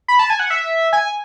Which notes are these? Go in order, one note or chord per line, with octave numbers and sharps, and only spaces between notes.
B5
A5
G#5
F#5
E5
G#5